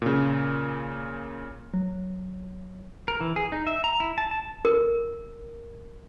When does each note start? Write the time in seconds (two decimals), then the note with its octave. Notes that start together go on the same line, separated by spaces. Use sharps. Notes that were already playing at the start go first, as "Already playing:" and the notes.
0.02 A#2 C#3
1.74 F#3
3.08 A#4
3.21 E3
3.36 G#4
3.52 D#4
3.67 E5
3.84 A#5
4.00 E4
4.18 A5
4.31 A5
4.65 A#4